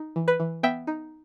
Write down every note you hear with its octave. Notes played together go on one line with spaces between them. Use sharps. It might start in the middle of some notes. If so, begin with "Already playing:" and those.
Already playing: D#4
E3
B4
E3
B3 E5 G5
D#4